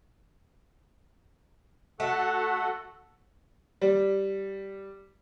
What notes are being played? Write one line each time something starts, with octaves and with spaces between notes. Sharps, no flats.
A3 F#4 A4 F#5
G3